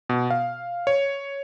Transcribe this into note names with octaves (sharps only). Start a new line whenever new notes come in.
B2
F5
C#5